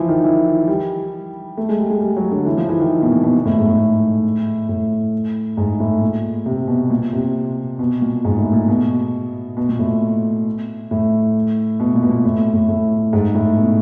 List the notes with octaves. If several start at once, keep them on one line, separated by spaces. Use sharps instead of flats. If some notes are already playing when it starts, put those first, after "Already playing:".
Already playing: E3 F3
D#3
E3
G3
A3
G#3
G3
G#3
G3
F#3
D3
E3
F3
E3
D#3
B2
A#2
B2
A2
G#2
A2
A2
G#2
A2
A#2
C3
B2
A#2
C3
B2
A#2
G#2
A2
A#2
B2
B2
A#2
A2
A2
B2
A#2
B2
A#2
A2
A2
A2
G#2
A2
B2